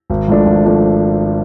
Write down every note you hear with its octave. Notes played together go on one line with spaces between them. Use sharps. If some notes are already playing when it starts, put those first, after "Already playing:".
G#1
G#2 F3 A3 D4
G#1
F3 A3 D4